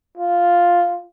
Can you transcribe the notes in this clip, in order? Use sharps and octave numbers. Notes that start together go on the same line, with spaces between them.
F4